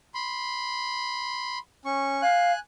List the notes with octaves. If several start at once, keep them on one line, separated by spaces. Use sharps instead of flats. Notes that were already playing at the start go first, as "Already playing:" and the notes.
B5 C6
C#4 C#6
F5 G#5 F#6